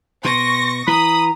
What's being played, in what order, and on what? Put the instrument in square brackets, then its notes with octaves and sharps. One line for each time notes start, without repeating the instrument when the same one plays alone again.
[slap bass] B2 [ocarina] C6 [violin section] C#6 A#6
[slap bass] E3 [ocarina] A#5 [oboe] B5 [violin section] D#6